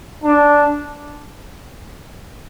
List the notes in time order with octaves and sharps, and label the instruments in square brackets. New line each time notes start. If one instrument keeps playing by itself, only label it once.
[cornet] D4